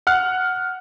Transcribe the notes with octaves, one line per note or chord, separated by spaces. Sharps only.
F#5 F6 F#6